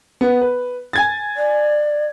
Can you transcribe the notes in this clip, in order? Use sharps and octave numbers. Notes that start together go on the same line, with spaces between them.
B3
B4
G#5 G#6 A6
D5